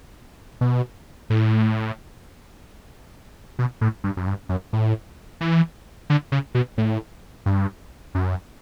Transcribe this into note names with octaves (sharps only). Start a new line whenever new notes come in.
B2
A2
B2
A2
G2
F#2
G2
F#2
A2
E3
D3
C#3
B2
A2
G2
F#2